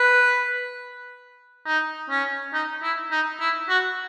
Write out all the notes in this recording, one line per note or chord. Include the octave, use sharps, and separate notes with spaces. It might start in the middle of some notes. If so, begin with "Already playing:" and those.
Already playing: B4
D#4
C#4
D#4
E4
D#4
E4
F#4